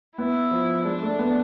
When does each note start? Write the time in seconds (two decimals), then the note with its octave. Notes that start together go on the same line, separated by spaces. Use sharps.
0.18 B3 E4
0.51 F3
0.85 G#3 D4
1.03 A3
1.19 B3